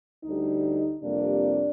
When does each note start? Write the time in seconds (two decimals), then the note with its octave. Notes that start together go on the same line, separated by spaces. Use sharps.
0.24 D2 D3 G3 D#4
1.02 F2 C3 G3 A#3 D4